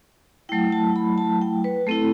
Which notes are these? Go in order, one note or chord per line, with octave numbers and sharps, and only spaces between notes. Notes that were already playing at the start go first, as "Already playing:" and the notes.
F#3 A3 E4 G5
A5
B5
A5
G5
B4
A3 C4 E4 A4